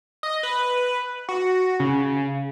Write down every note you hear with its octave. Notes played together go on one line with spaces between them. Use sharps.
D#5
B4
F#4
C#3